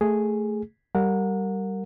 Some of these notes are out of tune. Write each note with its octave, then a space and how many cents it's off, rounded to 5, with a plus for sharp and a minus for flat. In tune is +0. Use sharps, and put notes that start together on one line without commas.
A3 +0 G#4 +0
G3 -15 A#4 -20 F#5 -30